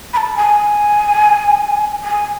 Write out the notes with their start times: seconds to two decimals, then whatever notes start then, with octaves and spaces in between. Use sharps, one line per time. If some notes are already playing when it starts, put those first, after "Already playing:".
0.13 B5
0.17 A5
0.37 G#5
2.04 G#5